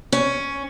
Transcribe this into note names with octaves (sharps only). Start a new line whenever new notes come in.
C#4